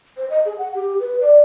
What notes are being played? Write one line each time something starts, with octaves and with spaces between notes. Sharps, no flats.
C5
D#5
G#4
F#5
G4
B4
D5